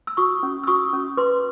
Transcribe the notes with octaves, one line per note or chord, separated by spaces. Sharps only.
E6
F#4 C#6 D#6
C#4
E6
F#4 C#6 D#6
C#4
B4 C6 D6